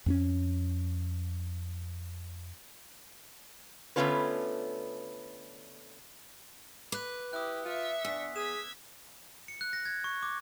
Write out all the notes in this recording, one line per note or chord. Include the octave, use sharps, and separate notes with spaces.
F2 B3 C#4
D3 A3 B3 C#4 F4 B4
B4 D6 F#6
E4 G4 D#6 F#6
F4 E5 C#7
E2 D4 E6 B6
G#4 G#6 B6 E7
C#7
F#6
A#6
G#6
C#6
D6